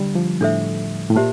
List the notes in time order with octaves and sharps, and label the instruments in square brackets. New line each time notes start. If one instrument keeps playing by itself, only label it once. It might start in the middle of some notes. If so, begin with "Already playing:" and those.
Already playing: [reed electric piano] D3 G3
F3
[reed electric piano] A2 [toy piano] D4 A4 C5 E5
[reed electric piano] A2
[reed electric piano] A#2 [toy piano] G4 C5 E5 A5